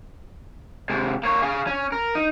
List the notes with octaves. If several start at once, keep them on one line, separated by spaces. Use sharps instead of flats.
C3 G#3
A#3 C#5
G#4 F5
C#4
A#4
D#4